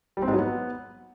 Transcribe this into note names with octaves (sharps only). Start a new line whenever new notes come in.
G3
C4
G#2
F#3
B3